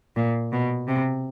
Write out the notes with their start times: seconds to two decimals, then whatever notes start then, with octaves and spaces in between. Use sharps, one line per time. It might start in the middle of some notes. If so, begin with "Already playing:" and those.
0.16 A#2
0.52 B2
0.88 C3